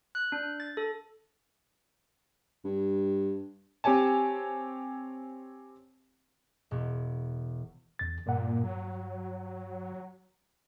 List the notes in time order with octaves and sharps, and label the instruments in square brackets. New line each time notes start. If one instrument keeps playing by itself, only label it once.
[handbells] F#6
D4
A6
A4
[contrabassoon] G2
[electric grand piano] C4 G4 C#5 G#5 A5
[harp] E1
[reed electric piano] E2 A6
[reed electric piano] G2 F#5 [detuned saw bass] A#2
[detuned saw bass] F#3